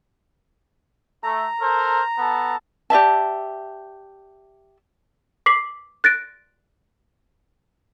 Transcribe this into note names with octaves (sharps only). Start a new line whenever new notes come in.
A3 A#5
A4 A#4 C5
B3 A4 A5
G4 D5 E5 A5
D6 B6 C7 F#7
F#6 A6 A#6 D7